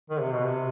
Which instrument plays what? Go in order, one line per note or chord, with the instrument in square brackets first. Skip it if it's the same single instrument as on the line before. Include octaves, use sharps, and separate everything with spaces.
[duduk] D#3
C3
B2
C3